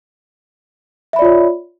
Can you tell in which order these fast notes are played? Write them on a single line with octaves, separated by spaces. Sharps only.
E5 B5 D5 F4 C#5